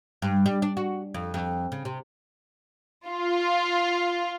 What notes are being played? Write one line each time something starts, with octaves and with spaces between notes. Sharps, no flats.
G2
G3
D4
F#4
F2
F2
C#3
C3
F4